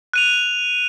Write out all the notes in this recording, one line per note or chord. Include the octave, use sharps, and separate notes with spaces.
F#6 D#7 F7